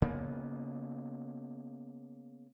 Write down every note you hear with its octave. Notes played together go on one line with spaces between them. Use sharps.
C#3 A#3 B3